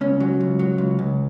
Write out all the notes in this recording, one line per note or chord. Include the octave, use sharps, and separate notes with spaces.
C#2 C#4
F#3
C#2
F#3
C#2
C#2